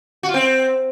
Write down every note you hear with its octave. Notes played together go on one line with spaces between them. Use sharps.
F#4
F4
C4